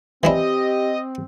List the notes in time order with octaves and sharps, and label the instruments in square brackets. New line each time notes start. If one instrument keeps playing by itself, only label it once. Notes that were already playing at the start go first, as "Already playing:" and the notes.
[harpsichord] E3 D4 E4 [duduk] C4 [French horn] G4 [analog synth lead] D#5